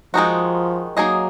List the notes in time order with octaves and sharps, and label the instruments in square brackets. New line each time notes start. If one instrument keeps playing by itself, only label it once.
[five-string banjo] D#3 G#3 D#4 F#4 [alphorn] F3
[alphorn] F#3 [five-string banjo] A#3 D#4 G#4 D#5